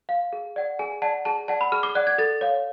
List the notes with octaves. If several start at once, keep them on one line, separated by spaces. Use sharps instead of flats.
F5
G#4
D5 F#5
G#4 G#5
D5 F#5 A5
G#4 A5
D5 F#5 A5
B5
G#4 F6
D6
D5 F#5 F#6
G#6
A4 A6
C#5 F5